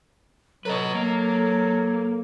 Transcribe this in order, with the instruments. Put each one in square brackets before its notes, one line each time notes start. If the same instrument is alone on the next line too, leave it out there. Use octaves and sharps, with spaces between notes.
[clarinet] F#3 [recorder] A4 [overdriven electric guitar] B4 D#5
[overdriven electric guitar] A#3